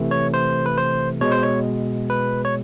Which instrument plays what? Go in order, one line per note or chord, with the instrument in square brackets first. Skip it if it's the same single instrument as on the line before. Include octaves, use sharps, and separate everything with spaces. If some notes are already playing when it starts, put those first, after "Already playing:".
Already playing: [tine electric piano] C3 E3 A3
C#5
C5
B4
C5
B2 G#3 C#5
C5
C#5
B4
C#5